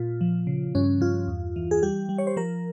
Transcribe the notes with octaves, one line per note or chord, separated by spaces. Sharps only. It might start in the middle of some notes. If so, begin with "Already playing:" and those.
Already playing: A#2 F4
F3
C#3
G2 C#4
G2 F4
E2
E3
G#4
G3 G4
G3
C#5
C5
F3 A#4